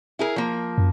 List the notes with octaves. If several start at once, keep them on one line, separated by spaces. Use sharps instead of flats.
E4 G#4 A#4
F3 A#3
F#2